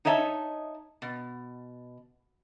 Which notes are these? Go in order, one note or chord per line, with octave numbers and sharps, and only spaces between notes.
D#4 C#5 D#5 E5 A5
B2